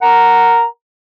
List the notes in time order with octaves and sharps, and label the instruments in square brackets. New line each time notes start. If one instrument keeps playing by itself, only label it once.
[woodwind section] A#4 F#5 A#5